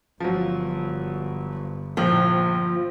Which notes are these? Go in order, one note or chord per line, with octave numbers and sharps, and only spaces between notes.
G1 F3 F#3
A#1 F3